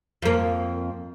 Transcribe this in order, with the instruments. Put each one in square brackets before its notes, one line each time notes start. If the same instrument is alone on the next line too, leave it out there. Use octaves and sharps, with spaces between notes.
[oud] F2 A#3